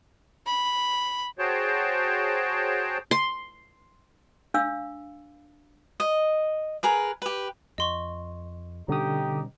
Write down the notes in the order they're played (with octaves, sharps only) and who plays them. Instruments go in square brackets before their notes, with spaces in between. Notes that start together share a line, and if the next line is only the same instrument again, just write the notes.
[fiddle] B5
[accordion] F#4 G#4 C5 C#5 G5 A5
[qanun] C6
[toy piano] D4 F5 E6
[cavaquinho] D#5
G#4 A#4 B4
G4 B4
[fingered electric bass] F2 [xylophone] D#5 C6 C#6
[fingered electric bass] B2 G3 C#4 [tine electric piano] D3 D#6 [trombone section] D#4 G4